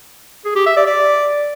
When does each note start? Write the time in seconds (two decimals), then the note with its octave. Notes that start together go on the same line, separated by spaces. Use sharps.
0.45 G#4
0.55 G4
0.66 E5
0.76 D5
0.87 D5